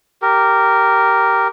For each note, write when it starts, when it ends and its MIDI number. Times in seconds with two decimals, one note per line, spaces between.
0.22 1.48 67
0.22 1.48 70